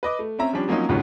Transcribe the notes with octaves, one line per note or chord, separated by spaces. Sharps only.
B4 D#5 D6
A3
C4 C#4 E5 A#5
F3 G3 C#4 D4
F3 F#3 A#3 C4 C#4 D#4
C#2 G#2 B2 D3 B3 C#4